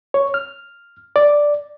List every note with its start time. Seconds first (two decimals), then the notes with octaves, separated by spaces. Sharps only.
0.14 C#5
0.34 F6
1.16 D5